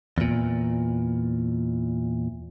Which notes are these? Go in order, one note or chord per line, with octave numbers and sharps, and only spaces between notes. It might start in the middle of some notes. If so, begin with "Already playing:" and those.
E2 A#2